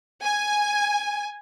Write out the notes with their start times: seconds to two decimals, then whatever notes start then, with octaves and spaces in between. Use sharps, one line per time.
0.23 G#5